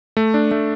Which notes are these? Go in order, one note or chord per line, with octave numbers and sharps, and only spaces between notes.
A3
D4
A3